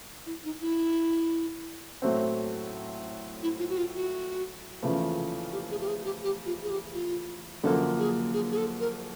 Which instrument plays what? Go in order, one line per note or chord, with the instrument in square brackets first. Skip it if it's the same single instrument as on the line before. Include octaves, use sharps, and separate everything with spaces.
[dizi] E4
D#4
E4
[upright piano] A2 F#3 A3 C4
[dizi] E4
F4
F#4
F4
F#4
[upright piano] E2 C#3 F3 A3
[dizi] G4
G#4
G4
G#4
G4
G4
F4
G#4
G4
F4
[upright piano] F#2 D3 F3 A#3 [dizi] A4
[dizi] G#4
G#4
G#4
A4
A#4